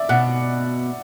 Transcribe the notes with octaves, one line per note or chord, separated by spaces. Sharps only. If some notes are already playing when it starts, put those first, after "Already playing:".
Already playing: D5 E5
B2 F#5